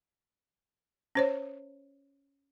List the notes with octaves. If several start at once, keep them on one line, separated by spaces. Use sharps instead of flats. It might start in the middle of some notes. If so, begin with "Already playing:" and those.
C#4 C5 C#5